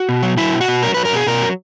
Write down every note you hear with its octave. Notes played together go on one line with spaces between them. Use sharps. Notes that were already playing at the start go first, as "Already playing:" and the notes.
Already playing: F#4
B2
F#3
F#3 E4
B2
F#4
B2
F#3 A#4
F#3 B4
A#4
B2 G#4
B2 A#4
F#3